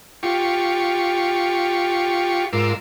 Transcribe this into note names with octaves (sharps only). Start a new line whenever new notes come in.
F4 G4 C#6
G#2 F4 A#4 C6 D6 E6